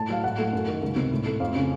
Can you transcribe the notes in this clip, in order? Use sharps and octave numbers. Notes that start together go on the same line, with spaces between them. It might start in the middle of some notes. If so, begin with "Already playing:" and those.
Already playing: A2 A5
F#3 F5
A2 F#5
A3
F#2
D#3
C#2
C3
A2
A3
F2 F5
C#3